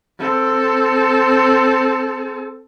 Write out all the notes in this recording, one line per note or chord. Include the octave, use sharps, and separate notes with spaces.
C4 A4